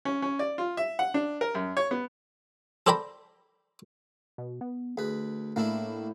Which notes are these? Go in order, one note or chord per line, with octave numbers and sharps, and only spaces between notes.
C#4
C#4
D5
F4
E5
F#5
D4
A#4
F#2
C#5
B3
A4 C5 D5 G5 A#5 B5
B2
B3
D2 G#4 B4
A2 A#3 D4 E4